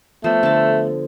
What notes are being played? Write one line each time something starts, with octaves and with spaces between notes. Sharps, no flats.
F3 A3 B3 C5
D3 A4 A5